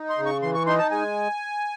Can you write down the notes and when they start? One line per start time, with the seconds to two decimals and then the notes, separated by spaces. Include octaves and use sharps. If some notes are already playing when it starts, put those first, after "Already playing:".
Already playing: D#4
0.10 C6
0.18 C#3
0.26 C#6
0.42 E3 C6
0.54 C#6
0.67 D#4 C6
0.79 A5
0.91 G#3 G#5